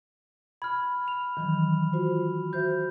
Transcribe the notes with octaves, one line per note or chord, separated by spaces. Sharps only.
B5 F6 G#6
F7
D#3 E3 F#3
F4 F#4 C5
F#4 C5 E5 G6